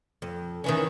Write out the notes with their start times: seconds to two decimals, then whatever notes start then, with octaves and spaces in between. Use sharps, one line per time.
0.22 F2
0.64 D#3 E3 C#4